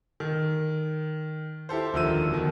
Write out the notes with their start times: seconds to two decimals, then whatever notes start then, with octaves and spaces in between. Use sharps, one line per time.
0.20 D#3
1.69 E4 G4 A4 C5
1.93 E1 D3 D#3 F3 E6 D#7
2.31 B2 D#3